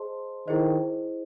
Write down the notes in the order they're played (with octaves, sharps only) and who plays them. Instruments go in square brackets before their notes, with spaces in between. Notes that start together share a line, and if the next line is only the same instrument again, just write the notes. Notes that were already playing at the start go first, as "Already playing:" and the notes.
Already playing: [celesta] G#4 C5 D#5 A5 C6
[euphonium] D#3 [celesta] E4 G#4 C5 D#5